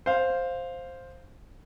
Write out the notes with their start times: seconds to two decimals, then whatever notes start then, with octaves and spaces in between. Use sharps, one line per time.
0.06 C5 F5